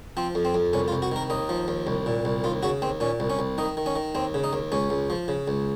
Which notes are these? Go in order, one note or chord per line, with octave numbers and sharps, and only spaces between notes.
F3 C4
F2
C4
F2
C2 C#4
F4
C2
F#4
D#3 A#4
D#2 D#4
F3
D#2
C2
A#2
C2
D#2 F4
C#3 F#4
D#2 C4
A#2 C#4
C2
C#4
C2
D#3 D#4
D#3
C#4
D#3
D#2 C4
C#3
D#4
D#2
C#2 C#4
C#2
F3
C#3
C#2